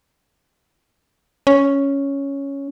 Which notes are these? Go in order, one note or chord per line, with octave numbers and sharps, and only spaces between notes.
C#4